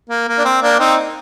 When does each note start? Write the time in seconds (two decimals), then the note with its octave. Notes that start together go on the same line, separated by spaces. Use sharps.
0.10 A#3
0.28 A#3
0.38 D4
0.45 C4
0.62 A#3 D4
0.79 C4 D#4